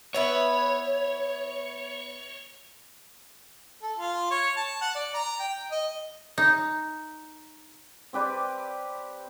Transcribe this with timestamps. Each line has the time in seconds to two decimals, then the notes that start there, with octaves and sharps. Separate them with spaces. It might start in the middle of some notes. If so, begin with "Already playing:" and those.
0.14 B3 E4 B4 C#5
3.83 A4
3.98 F4
4.31 C#5
4.56 A5
4.82 F#5
4.95 D5
5.15 A#5
5.40 G5
5.72 D#5
6.38 D#4
8.13 C4 G4 B4 D5